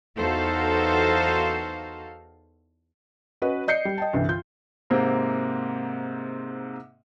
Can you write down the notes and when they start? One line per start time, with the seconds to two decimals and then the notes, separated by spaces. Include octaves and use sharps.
0.17 E2 D#4 F#4 A4 C5 F5
3.42 C#4 F#4 B4 D#5
3.67 D5 D#5 G6 C7 C#7
3.85 G3
3.98 D#5 G5 A5
4.13 C2 G2 D3 E3
4.29 F4 G6
4.90 G#2 C3 A#3 C4